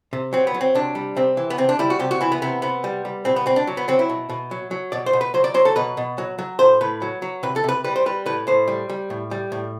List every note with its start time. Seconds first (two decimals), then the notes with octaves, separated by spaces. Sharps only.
0.13 C3
0.33 F#3 C4
0.47 B3
0.55 F#3
0.61 C4
0.75 C3 D4
0.95 G3
1.16 C3 C4
1.37 E3
1.50 B3
1.58 C3 C4
1.69 D4
1.79 G3 E4
1.90 F#4
1.99 C3 G4
2.11 F#4
2.21 E3 E4
2.32 B3
2.42 C3 B3
2.62 C3 B3
2.84 G3
3.05 G3
3.25 B2 C4
3.36 B3
3.46 B2 C4
3.56 D4
3.67 F#3
3.77 B3
3.88 F#3 C4
3.99 E4
4.09 B2
4.29 B2
4.51 F#3
4.71 F#3
4.92 B2 D5
5.06 C5
5.13 B2
5.21 B4
5.34 F#3 C5
5.44 D5
5.54 F#3 C5
5.65 A4
5.76 B2 B4
5.97 B2
6.18 F#3
6.39 F#3
6.59 A2 C5
6.81 A2 B4
7.02 F#3
7.22 F#3
7.43 C3 B4
7.56 A4
7.64 C3 B4
7.84 G3 B4
7.96 C5
8.06 G3 B4
8.26 A2 B4
8.47 A2 C5
8.68 G3
8.90 G3
9.10 A2
9.31 G3
9.52 A2